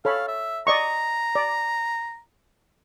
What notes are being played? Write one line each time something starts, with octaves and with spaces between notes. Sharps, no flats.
A4 C#5 F5 B5
E5
D5 D#5 A#5 C#6
D5